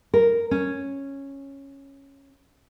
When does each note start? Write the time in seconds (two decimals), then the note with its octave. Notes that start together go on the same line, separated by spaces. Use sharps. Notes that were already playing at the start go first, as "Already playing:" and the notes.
0.13 A#4
0.51 C#4